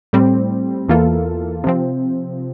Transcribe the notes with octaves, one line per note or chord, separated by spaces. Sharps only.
A2 G3 C4
E2 E3 A#3 F4 A4
C3 F3 C4